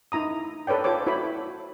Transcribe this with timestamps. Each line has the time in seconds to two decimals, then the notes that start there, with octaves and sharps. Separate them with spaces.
0.12 D#4 E4 A#5 D#6
0.67 A4 B4 C#5 D5 G5
0.84 F4 A4 C5 C#5 D6
1.07 E4 F#4 C5 C#5 B5